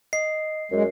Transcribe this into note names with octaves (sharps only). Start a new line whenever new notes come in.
D#5 C7
F#2 G#3